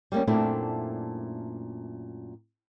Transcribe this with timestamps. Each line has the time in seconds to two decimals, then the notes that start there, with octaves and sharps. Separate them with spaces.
0.12 G3 A#3 C#4
0.27 F#2 A#2 A3 C4 D4 E4